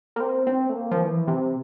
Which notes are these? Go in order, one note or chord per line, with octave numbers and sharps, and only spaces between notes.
A#3
C4
C4
A3
A#3
F3
E3
C3